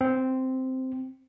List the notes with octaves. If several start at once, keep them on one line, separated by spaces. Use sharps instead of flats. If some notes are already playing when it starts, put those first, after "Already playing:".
C4